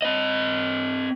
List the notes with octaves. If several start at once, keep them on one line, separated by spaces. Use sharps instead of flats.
C4 D#5